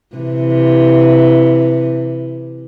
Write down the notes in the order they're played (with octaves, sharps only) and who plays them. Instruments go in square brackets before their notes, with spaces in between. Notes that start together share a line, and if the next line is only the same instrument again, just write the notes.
[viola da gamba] C3 E3